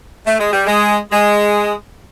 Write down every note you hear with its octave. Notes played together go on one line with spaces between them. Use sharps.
A3
G#3
G3
G#3
G#3